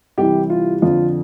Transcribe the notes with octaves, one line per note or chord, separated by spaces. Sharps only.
C2 C3 E3 G4
F4
F2 D3 F3 F4